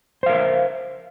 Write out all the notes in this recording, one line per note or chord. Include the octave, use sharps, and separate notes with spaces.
A#4 C5 E5 F5